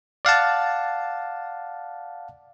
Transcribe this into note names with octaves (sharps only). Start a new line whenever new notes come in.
D5 F5 F#5 A5